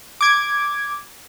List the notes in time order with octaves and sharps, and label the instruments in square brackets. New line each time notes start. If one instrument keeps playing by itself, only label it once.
[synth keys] D6 G#6